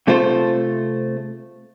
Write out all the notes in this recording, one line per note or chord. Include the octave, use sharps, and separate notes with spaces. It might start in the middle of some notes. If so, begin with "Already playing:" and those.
C3 A3 F4 C5